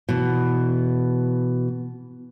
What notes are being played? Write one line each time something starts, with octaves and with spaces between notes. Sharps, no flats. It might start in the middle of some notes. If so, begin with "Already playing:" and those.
B2 E3